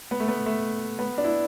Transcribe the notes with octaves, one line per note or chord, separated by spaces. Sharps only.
B3
A3
B3
A3
B3
D4
E4